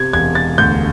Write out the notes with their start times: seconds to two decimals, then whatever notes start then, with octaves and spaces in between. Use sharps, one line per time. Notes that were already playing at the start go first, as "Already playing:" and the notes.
Already playing: C3 G#6
0.13 E1 G#6
0.35 A6
0.58 D2 G6